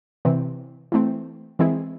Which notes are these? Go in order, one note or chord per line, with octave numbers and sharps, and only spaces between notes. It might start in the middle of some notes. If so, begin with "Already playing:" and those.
C3 E3 C4
E3 A3 C4
E3 G#3 C4 E4 G#4